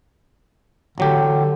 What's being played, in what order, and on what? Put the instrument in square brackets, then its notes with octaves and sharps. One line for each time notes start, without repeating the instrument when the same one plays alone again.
[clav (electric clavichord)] A1 F#3 G4 [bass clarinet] D3